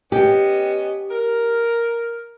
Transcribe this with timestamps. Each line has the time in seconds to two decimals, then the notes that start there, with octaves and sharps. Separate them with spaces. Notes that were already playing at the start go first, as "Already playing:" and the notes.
0.12 B3 C#4 G4 D#5
1.11 A#4